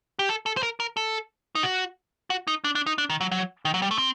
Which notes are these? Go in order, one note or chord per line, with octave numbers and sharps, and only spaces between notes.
G4
A4
A4
C5
A#4
A#4
A4
D#4
F#4
F#4
D#4
D4
D4
D#4
D4
D#3
F#3
F#3
D#3
F#3
G3
A3
C4